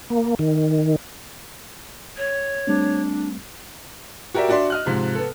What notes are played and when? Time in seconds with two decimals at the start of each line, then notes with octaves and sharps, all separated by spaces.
0.10 A#3
0.39 D#3
2.17 C#5
2.67 G3 A3 C4 D4
4.34 F#4 G4 A#4 D5 E5 G5
4.49 D4 F#4 D5 E5 C6
4.70 D#5 F6 F#6
4.86 G#2 C3 F3
5.15 B3 A4